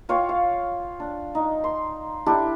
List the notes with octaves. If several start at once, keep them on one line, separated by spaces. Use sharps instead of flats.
F4 C#5 F5 G5
F5
D4
D#4
C6
D4 E4 G4 A4